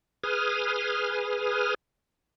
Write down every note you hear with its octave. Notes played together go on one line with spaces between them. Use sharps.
G#4 B4 D#6 F6